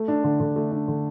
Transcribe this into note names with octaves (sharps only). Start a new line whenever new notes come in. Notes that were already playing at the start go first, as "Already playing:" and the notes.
Already playing: A3
D4
D3
D3
A3
D4
D3